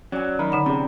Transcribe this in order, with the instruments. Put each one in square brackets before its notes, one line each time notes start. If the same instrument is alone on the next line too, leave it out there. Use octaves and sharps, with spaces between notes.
[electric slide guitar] F#3 [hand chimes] C#4 [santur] D5 G#5
[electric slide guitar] D#3 [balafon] F#3 [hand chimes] A#5 [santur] B5
[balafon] D3 D#4 F#5
[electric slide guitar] C3 [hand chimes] C#4 G#4 [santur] D5